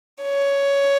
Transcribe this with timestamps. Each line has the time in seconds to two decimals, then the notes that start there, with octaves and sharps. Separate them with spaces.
0.23 C#5